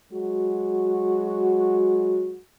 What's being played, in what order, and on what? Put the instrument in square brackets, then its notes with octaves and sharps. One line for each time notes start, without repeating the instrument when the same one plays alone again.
[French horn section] F#3 G#3 F#4